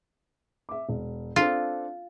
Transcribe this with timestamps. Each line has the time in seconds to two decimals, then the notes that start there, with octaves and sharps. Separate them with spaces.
0.69 E5 D6
0.89 E1
1.36 C4 D4 F4 A4